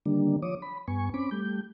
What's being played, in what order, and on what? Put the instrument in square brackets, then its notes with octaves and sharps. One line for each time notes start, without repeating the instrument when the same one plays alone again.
[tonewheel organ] D3 D#3 G3 A#3 D4
F3 C#5 D6 D#6
B5
G2 B3 G#5 C#6
C4 C#4 B5 D6
G3 A3 G6